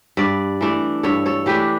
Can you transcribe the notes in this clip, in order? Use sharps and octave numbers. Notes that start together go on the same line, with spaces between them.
G2 B4 D5
E3 A3 D4
G2 A4 C#5
A4 C#5
E3 A3 D4 G4 B4